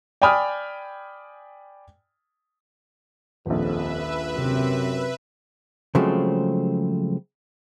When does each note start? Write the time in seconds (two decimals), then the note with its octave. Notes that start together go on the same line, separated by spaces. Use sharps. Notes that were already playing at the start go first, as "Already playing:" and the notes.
0.22 D5 G5 G#5 B5 D#6 F6
3.46 D#1 A#1 F2 B4 E5
4.35 F#2 C3
5.95 C#3 F3 F#3 G#3 A3 C4